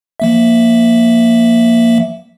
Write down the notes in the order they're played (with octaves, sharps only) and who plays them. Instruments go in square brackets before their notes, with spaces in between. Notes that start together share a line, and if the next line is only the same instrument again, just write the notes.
[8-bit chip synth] F3 A#3 E5